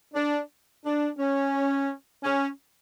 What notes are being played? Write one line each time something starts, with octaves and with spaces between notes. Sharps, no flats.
D4
D4
C#4
C#4